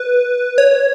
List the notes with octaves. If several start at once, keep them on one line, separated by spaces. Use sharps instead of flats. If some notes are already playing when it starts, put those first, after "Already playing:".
Already playing: B4
C#5